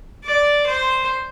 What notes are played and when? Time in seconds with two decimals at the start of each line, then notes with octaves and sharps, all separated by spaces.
0.24 D5
0.67 C5